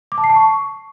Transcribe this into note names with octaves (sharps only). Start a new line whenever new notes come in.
D6
A5
C7
A5
C#6